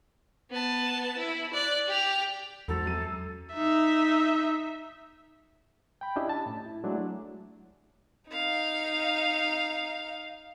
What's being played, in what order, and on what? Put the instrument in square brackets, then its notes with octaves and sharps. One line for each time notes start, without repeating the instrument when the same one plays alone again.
[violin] B3 A5
E4
D5 F#6
G4 F7
[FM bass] E2 [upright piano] G#2 F#3 [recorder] A4
[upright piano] F#2 D#7
[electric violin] D#4 E5
[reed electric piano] G5 B5
C#4 D4 E4 G4 D#5
A5
A2
E4
F#3 G#3 A3 D4 E4
[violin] D#4 F5